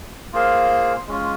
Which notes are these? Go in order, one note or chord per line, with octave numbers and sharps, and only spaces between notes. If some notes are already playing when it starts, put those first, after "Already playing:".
A#3 F4 G#4 C5 F5
G#3 C#4 F4